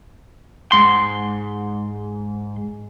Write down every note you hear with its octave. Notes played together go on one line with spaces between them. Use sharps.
G#2 C6